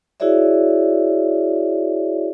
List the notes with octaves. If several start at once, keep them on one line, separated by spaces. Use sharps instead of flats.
E4 F#4 G#4 C#5 D5 E5